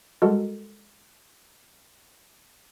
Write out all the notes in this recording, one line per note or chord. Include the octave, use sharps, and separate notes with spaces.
G3 G#3 F#4 A4 A#4